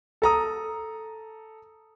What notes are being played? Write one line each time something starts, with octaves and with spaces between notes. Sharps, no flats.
A4 A#5 D#6